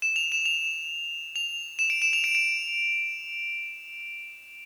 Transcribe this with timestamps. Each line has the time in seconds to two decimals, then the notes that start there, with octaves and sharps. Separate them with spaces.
0.02 E7
0.16 F7
0.32 E7
0.46 F7
1.36 F7
1.79 E7
1.90 D7
2.02 E7
2.13 F7
2.24 D7
2.35 D7